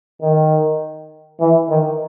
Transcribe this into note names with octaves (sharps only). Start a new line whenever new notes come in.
D#3
E3
D#3